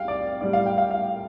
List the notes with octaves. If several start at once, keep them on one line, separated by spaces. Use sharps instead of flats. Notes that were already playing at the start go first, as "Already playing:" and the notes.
Already playing: C2 G3 F5 G5
D5
A2 G3 D5
F5
G5
F5
F5